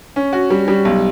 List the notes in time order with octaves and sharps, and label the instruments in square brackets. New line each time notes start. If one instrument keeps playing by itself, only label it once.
[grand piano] C#4
F#4
G3
G3
B1